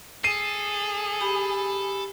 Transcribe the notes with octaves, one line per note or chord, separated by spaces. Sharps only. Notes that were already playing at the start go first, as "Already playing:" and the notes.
G#4 A4 C7 D#7
G4 G#5 B5